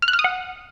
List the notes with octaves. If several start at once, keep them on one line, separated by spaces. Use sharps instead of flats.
F6
F#6
F6
D#6
F#5